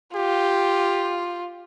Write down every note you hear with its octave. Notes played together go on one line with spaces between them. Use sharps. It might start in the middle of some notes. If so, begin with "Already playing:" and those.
F4 G4